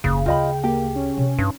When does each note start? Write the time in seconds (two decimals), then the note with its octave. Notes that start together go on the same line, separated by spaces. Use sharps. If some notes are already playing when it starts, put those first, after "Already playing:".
0.04 F#1 D#2 C#3
0.26 D2 F4 D#5 G5 B5
0.64 A#3 G4
0.96 C#4
1.17 C3
1.39 G2 D#4